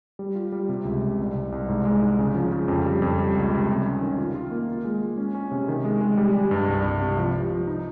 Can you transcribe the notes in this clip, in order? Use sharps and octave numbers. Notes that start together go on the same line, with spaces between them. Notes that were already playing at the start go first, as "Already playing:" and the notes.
G3
F4
G3
C3
C#2
C3
C2
C2
C2
G#2
G#3
G#2
C#3
F3
C#3
F2
G3
F2
G3
C#2
C3
G3
C#4
D#3
F4
F4
A#3
F4
G#3
G#3
C#4
C#4
C3
D#3
G#3
G#3
G3
G3
G2
C2
C2
C3
F3
G4
F3
D#4